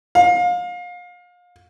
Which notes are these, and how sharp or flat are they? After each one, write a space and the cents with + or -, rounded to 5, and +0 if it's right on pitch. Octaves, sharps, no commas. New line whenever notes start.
F5 +30